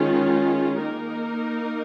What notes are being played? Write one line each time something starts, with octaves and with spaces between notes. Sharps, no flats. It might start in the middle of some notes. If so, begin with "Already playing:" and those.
Already playing: D#3 G#3 C#4 F4
A#3 D#4 A#4